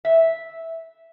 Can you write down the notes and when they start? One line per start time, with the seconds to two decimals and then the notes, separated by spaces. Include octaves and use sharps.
0.05 E5